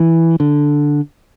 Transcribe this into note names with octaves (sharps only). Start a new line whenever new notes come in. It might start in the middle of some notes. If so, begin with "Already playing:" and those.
Already playing: E3
D3